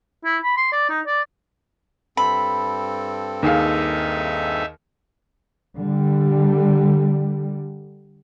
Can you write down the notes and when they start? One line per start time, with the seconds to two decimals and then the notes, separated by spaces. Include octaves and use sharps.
0.25 E4
0.43 B5
0.57 C6
0.72 D5
0.89 D#4
1.07 D5
2.17 G2 C4 A4 B5
3.43 D#2 D#4 G#4 E5 F5
5.77 D3 G3